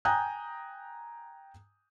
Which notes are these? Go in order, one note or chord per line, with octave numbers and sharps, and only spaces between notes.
G5 G#5 A#5 D#6 F#6 G6